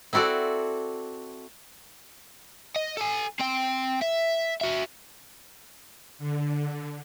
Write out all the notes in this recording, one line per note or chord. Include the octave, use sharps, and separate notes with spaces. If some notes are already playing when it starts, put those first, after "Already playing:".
C4 E4 F#4 A4 D5
D#5
A4 G#5
C4 G5
E5
F#4 E5
D3